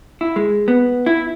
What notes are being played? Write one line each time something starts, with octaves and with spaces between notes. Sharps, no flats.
E4
G#3
B3
E4